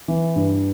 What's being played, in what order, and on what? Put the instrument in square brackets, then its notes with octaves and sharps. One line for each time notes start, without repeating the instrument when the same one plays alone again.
[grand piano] E3
G2